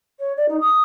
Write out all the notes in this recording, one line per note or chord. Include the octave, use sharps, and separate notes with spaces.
C#5
D5
D#4
D#6